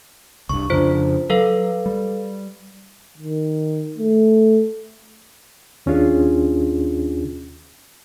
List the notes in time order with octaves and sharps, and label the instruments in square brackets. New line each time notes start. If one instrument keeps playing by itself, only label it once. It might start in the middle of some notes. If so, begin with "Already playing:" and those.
[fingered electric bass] C2 G2 [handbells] C#6
[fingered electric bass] F2 C#3 D4 [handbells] F4 C5
[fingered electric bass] F#3 [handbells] A4 B4 F5
[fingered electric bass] G3
[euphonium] D#3
A3
[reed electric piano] D#2 C#4 D4 F4 G#4